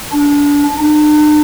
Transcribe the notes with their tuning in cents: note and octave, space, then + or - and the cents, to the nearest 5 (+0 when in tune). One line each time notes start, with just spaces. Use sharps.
D4 -25
D4 +45